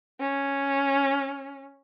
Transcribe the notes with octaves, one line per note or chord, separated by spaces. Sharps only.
C#4